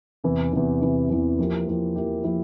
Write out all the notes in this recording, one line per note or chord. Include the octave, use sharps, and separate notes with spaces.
E2 C3 E3
E2 C3 E3
E2 C3 E3
E2 C3 E3
F3 A#3 E4 G4
F3 A#3 E4 G4
F3 A#3 E4 G4
F3 A#3 E4 G4